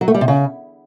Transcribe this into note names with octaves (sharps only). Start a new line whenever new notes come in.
F#3
A3
G3
C3
C#3